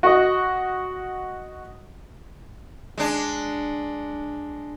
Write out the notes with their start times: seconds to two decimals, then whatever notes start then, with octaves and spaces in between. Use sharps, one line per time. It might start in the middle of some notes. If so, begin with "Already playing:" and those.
0.03 F#4 D#5
2.98 G#3 D4